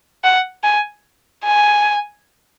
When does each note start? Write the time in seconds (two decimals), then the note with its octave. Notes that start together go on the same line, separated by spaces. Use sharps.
0.24 F#5
0.64 G#5
1.45 G#5